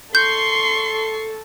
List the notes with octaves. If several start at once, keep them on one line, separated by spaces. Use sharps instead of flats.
A4 C6 C#6 G6 C7